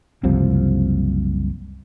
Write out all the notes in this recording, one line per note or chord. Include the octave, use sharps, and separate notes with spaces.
F#1 C2 C3 F3